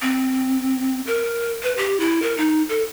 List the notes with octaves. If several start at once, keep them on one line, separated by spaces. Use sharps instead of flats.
C4
A#4
B4
G4
E4
A#4
D#4
A4